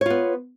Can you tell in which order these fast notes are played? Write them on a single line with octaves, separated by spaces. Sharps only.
C#5 F4 B3